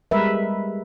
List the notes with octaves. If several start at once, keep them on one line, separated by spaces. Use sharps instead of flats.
G3 G#3 A#4 B4 E5